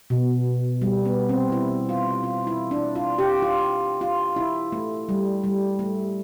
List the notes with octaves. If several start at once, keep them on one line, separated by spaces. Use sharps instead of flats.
B2
G3
B3
C4
E4
F4
F4
E4
D4
F4
G4
F4
F4
E4
A3
G3
G3
A3